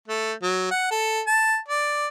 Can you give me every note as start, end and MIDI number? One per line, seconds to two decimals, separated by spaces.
0.08 0.33 57
0.43 0.66 54
0.71 0.88 78
0.91 1.21 69
1.27 1.58 81
1.68 2.07 74